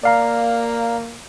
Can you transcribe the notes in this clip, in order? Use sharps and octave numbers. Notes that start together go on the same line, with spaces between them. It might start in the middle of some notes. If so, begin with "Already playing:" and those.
A#3 D5 F5 A#5